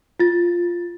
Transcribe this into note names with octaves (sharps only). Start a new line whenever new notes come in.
F4 A6